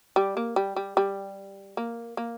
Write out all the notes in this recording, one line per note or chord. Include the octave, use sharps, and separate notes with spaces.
G3
A#3
G3
G3
G3
A#3
A#3